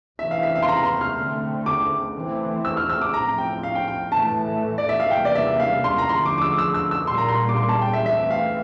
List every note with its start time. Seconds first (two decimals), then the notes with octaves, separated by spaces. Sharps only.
0.19 C3 E3 A3 C4 E5
0.31 F5
0.43 E5
0.55 F5
0.62 C6
0.68 A#5
0.85 C6
1.01 F6
1.17 D3 A3 C4
1.66 D6
2.15 E3 A3 C4
2.65 E6
2.77 F6
2.89 E6
3.02 D6
3.14 A2 F3 C4 A#5
3.38 G5
3.63 F5
3.75 G5
3.88 G5
4.12 A2 E3 A3 A5
4.78 D5
4.89 E5
5.00 F5
5.11 C3 E3 G3 A#3 G5
5.25 D5
5.35 E5
5.60 F5
5.84 C6
5.98 A#5
6.09 D3 F3 A3 C6
6.26 D6
6.38 D6
6.42 E6
6.58 E6
6.74 E6
6.91 E6
7.07 A#2 G3 A#3 C6
7.18 A#5
7.28 C6
7.49 D6
7.57 C6
7.69 A5
7.81 G5
7.93 E5
8.05 E3 A3 C4 E5
8.31 F5